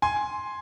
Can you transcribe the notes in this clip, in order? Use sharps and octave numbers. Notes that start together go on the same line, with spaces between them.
G#5 C6